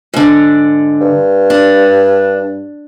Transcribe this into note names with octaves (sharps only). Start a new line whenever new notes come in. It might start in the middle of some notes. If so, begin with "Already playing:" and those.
G#2 D3
G2
D4